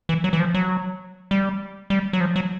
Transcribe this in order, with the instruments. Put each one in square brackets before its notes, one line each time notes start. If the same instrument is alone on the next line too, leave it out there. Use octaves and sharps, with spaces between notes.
[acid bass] E3
F#3
E3
F3
F#3
G3
G3
F#3
F3
F#3